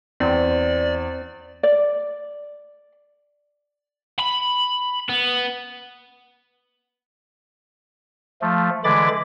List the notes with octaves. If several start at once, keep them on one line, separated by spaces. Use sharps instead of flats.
E2 C4 D5
D5
B5
B3
F3 A3
D3 E3 G#3 B5 D6 A6